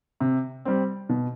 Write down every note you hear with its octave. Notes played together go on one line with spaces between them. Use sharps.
C3
G3 C4
B2